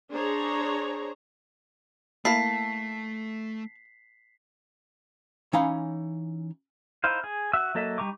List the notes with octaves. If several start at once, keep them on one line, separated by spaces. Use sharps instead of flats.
D4 G#4 C5 C#5 A#5
A3 A#3 E4 A5 B6 C7
E3 C#4 D#4 C#5 F5 B5
D#4 E4 C5 F5
G#4
F#4 E5 E6
F#3 A#3 A4 D#5 E5
G3 D#4 A#5 C#6 D6